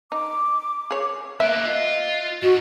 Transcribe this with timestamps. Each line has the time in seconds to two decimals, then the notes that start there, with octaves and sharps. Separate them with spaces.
0.12 D#4 D6
0.91 G#4 C#5
1.40 A#3 B3 E5 F#6
1.65 F4 D#5
2.42 G#2 F#4 D#5